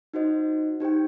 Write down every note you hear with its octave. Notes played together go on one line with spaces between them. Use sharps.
D#4 F#4 C5 D#5
D#4 G4 C5 G5